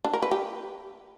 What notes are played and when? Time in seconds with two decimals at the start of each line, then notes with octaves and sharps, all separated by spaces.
0.04 D4
0.13 A#4
0.22 B4
0.31 G4